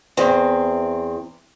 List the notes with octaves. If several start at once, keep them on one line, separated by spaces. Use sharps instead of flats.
E2 C4